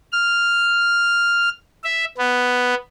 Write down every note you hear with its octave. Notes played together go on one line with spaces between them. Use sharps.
F6
E5
B3